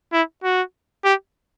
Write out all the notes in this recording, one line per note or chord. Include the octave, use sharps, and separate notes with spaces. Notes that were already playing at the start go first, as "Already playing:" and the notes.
E4
F#4
G4